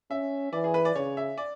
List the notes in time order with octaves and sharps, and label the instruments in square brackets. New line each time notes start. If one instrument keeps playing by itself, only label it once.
[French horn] C#4 [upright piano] E5
[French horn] E3 [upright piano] D5
[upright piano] G#4
B4
D5
[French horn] C#3 [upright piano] C#5
[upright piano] E5
D5